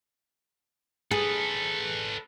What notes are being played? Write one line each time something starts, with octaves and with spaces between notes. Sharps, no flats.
G#4 A4 B4